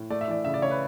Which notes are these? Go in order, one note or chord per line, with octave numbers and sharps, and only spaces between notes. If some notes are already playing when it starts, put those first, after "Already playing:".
Already playing: A2
A3 D5
E5
E3 D5
C#3 E5
D5
C#3 C#5
B4